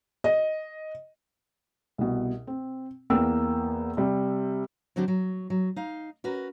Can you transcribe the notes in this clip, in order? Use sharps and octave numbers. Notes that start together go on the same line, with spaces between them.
D#5
C2 B2
C4
E2 A#3 B3 G5 E6
C3 G3
D3 F#3 C4 D4 F#4 G4
F#3
F#3
D#4 F5
C#4 F#4 A#4 B4